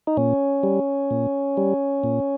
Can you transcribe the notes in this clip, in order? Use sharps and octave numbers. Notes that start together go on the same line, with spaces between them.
D#4
A#2 C#4
G3
A#2
G3
A#2